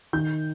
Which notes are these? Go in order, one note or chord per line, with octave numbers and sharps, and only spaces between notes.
D#3 G6